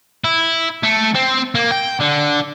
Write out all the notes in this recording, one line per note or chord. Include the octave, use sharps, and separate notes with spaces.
E4
A3
C4
A#3
G5
D3